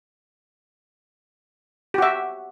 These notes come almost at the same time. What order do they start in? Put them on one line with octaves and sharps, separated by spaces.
G4 F#4 E5